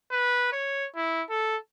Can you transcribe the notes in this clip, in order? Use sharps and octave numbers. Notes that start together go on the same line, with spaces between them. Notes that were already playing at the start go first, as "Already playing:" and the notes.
B4
C#5
E4
A4